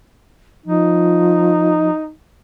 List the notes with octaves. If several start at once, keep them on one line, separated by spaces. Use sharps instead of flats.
F3 D#4